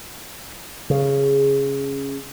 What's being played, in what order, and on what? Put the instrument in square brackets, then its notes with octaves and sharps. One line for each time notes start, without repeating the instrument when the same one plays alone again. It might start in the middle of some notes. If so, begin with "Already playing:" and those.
[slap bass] C#3